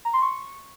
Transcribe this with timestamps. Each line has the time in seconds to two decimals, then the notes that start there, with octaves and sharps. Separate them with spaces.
0.05 A#5
0.13 C6
0.22 C#6